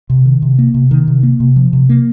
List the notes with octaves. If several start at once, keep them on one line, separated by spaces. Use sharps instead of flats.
C3
D#3
C3
A#3
C3
D#3
C3
A#3
C3
F3
C3
A#3